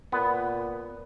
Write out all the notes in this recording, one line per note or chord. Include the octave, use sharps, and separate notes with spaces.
A#2 B3